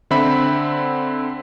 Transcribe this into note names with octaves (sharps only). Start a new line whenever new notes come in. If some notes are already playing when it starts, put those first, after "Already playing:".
D3 C4 E5 B5